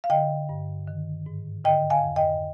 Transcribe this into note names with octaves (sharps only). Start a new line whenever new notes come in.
F5
D3 D#5 G5
G2
D#3
G#2
D3 D#5 G5
F5 G#5
F2
D#5 G5